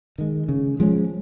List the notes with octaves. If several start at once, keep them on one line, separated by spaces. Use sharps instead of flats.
D#3 G#3
C#3
F3 G#3 C#4